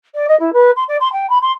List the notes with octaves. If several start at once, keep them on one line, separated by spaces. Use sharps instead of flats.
D5
D#5
E4
B4
C6
D5
C6
G5
B5
C6